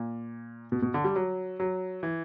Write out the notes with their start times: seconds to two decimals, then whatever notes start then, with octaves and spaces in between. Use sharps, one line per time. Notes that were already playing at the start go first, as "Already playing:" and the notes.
Already playing: A#2
0.72 B2
0.82 B2
0.94 D3
1.04 G3
1.16 F#3
1.60 F#3
2.03 E3